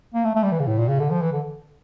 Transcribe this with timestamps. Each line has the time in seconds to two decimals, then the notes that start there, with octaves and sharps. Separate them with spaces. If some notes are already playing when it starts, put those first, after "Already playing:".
0.14 A#3
0.25 A3
0.35 A3
0.43 G3
0.52 E3
0.60 C#3
0.67 A2
0.78 A#2
0.89 C#3
1.00 D3
1.11 F3
1.22 E3
1.33 D3